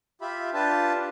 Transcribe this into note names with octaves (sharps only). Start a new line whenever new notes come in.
F4 G4 E5 B5
D4 F4 G4 B4 A5